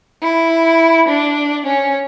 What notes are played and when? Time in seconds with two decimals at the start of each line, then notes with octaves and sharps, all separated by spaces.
0.23 E4
1.08 D4
1.66 C#4